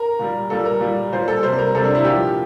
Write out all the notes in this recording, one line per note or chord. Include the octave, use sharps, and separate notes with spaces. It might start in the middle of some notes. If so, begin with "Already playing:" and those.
Already playing: A#4
A#2 G3
A#2 G3 A4
A#4
A#2 G3
A#2 G3 C5
A4
C3 G3 C5
A#4
C3 G3 A4
D4
E4
A#2 F3 G4